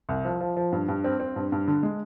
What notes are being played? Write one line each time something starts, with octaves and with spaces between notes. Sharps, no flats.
C2
F3
F3
F3
G2
G2
C4
C4
G2
G2
D3
G#3